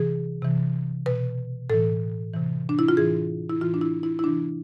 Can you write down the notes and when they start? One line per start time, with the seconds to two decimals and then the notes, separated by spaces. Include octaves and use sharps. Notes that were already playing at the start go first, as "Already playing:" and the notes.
Already playing: C3 E3 G#4
0.42 C3 E3
1.06 B2 B4
1.70 A2 E3 A4
2.33 C3 E3
2.69 D4
2.79 E4
2.88 F4
2.97 A2 E3 G#4
3.49 E4
3.61 A2 E3 F4
3.74 D4
3.81 E4
4.03 E4
4.19 E4
4.24 C3 E3 D4